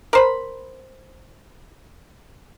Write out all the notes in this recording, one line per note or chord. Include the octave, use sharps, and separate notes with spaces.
A#4 C5 B5